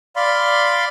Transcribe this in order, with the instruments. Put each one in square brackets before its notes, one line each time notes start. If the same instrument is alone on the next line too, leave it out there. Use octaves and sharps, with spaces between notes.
[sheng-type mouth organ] D5 F5 B5 C6